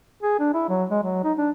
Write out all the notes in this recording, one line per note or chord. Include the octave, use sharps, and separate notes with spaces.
G#4
D4
E4
F#3
G#3
F#3
D#4
D4